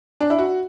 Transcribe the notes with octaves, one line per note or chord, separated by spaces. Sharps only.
D4
E4
F#4